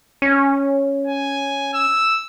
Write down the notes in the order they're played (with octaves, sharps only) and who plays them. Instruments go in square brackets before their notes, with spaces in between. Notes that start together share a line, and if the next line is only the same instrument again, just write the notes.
[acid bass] C#4
[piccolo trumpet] G#5
E6